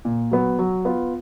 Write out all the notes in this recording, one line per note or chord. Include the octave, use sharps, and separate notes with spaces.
A#2
F#3 B3
F#3
B3 F4